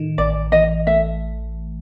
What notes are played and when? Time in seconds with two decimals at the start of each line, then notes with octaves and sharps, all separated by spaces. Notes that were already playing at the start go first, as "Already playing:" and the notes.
Already playing: A2 D#3
0.18 A1 D5
0.52 E3 D#5
0.87 A3 E5